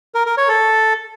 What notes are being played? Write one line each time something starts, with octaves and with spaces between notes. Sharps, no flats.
A#4
A#4
C#5
A4